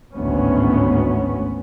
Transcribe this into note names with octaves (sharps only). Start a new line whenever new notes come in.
G#1 D2 A2 B3 C#4